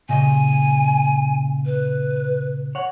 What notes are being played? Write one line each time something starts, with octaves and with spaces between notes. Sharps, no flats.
A#2 C#3 D#5 G#5
B4
C#5 F#5